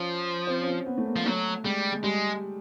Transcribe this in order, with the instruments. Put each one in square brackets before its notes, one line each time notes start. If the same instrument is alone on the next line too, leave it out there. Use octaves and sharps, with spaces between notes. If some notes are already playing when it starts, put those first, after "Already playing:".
Already playing: [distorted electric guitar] F3 [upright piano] C#4
[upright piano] C4
C#4
C4
B3
A3
A#3
[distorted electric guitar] F3
[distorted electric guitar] F#3 [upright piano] A3
[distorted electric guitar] G3 [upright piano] G#3
[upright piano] G#3
[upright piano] G3 [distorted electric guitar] G#3